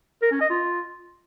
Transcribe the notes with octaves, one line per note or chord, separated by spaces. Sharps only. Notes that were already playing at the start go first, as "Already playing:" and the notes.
A#4
C#4
D#5
F4